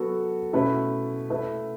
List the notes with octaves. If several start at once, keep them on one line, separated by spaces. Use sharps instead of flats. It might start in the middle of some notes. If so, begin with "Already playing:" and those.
Already playing: F#3 B3 F#4 A4
B2 A3 C#4 E4 B4
A3 E4 B4